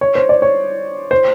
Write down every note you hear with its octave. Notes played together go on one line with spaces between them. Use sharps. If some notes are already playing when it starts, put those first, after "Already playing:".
C#5
C5
D5
C#5
C5